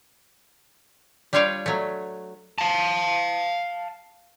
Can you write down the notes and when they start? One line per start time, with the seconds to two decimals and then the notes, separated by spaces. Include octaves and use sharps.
1.33 G3 D4 F4 C#5 F5 G5
1.66 F#3 A3
2.58 F5 A5